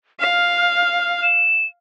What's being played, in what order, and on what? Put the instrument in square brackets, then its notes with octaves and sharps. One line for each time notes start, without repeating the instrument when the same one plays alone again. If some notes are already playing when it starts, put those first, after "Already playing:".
[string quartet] F5 [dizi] F6
[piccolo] E7